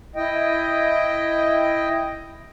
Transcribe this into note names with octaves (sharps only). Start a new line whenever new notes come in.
E4 D#5 G5